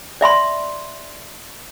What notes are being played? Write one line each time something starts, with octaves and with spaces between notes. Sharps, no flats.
D5 E5 B5 C6